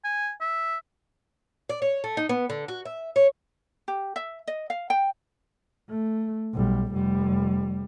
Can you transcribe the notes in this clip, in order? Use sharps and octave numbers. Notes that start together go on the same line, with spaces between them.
G#5
E5
D5
C#5
A3
D#4
B3
D3
F#4
E5
C#5
G4
E5
D#5
F5
G5
A3
B1 G3
F1 G3